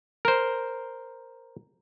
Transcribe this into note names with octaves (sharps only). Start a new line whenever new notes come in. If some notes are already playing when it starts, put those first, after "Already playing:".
A#4 C5